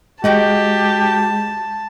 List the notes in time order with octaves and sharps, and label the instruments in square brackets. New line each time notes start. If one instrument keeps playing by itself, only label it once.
[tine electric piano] G#3 [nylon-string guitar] F#4 D#5 G5 [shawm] G4 [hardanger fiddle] A5